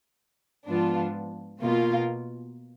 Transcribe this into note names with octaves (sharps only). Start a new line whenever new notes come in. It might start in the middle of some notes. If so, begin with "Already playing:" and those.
G#2 F3 B3 D4 F4
B2 A#3 F4 A#4